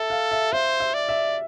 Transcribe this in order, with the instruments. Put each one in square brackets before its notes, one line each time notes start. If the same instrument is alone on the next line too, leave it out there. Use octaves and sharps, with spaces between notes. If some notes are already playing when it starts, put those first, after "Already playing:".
Already playing: [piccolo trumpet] A4 [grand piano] E5
[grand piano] F5
E5
[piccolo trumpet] C5 [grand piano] E5
[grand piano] E5
[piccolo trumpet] D5
[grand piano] E5